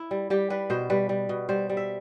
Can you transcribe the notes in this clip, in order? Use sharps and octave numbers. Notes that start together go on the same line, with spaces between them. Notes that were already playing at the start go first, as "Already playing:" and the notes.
Already playing: E4
G3
G3 G4
G3 B4
B2 C5
G3 B4
G3
B2
G3 C5
G3
E5